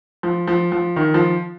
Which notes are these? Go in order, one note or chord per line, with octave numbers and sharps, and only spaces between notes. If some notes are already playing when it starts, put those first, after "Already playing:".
F3
F3
F3
D#3
F3